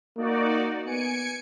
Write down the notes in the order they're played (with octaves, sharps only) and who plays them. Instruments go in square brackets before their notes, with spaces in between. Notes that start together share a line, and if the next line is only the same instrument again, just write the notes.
[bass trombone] A#3 [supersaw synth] D#4 F#4 D5
[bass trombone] B3 [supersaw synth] G#5 C#7 D7